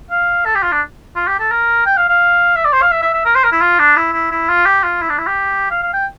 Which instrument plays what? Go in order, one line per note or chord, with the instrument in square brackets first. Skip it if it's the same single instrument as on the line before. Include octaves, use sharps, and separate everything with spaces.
[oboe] F5
A4
G4
F4
D4
F4
G4
A4
A#4
G5
F5
F5
E5
D5
C5
F5
E5
E5
E5
A#4
C5
A#4
E4
F4
D4
E4
E4
E4
F4
G4
F4
E4
D4
E4
G4
F5
F5
G5